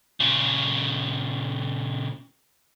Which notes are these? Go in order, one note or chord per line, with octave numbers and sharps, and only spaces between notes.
A#2 C#3